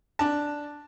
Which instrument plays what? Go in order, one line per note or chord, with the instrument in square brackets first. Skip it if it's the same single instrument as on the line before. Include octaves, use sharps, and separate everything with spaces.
[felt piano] D4 A5